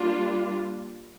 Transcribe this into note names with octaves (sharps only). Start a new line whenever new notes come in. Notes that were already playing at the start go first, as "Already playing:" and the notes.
Already playing: G3 A#3 D4 F4